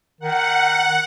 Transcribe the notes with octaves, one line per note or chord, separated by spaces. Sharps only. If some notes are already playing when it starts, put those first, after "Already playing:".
D#3 F#5